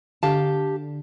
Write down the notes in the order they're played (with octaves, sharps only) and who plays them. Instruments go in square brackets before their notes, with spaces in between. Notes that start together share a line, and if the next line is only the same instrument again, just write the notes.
[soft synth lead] D3 [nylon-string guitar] G4 F5 A5